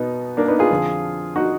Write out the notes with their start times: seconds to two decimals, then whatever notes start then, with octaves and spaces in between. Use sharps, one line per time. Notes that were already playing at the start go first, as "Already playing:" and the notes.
Already playing: B2 B3 D#4
0.37 A#3 D4
0.48 B3 D#4
0.59 F4 G#4
0.70 F2 D3 F3
1.36 D#4 F#4